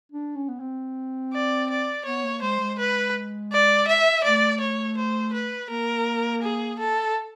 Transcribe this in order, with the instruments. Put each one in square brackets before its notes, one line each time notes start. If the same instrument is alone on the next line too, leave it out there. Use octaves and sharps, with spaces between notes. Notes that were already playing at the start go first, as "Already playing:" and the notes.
[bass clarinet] D4
C#4
B3
C4
[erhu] D5
D5
[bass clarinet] B3 [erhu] C#5
[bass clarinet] A#3
[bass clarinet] G#3 [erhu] C5
[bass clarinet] G#3
[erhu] B4
D5
E5
[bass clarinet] A3 [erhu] D5
[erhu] C#5
C5
B4
[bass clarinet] A#3 [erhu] A#4
[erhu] G#4
A4